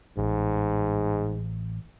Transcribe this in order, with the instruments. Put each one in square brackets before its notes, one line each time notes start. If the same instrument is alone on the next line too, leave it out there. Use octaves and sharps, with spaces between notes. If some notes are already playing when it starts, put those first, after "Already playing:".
[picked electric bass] A1 [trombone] G#2